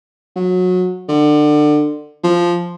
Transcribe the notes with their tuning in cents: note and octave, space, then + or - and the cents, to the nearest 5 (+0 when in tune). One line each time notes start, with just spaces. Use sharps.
F#3 -25
D3 +25
F3 -5